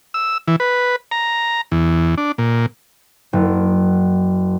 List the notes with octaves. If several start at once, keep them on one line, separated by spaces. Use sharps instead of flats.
E6
E3
B4
A#5
E2
D4
A#2
F#1